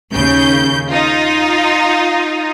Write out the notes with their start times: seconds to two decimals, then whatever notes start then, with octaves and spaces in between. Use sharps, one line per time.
0.12 D#2 C#3 G6
0.89 D#4 F4